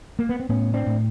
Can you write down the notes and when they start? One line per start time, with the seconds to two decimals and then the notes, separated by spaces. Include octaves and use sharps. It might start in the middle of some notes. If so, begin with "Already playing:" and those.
0.19 A#3
0.29 B3
0.40 C4
0.49 A2 B3 C#4
0.74 C4 D4
0.86 A2